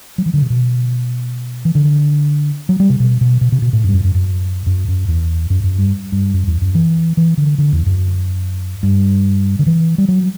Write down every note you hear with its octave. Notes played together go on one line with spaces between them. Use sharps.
F#3
E3
D3
C3
B2
E3
D3
F#3
G3
C3
B2
B2
B2
C3
B2
A2
F#2
G2
F#2
F#2
F#2
F#2
F#2
E2
F#2
F#2
G2
G2
F#2
E2
F#2
E3
E3
D3
D3
E2
F#2
G2
D3
E3
G3
F#3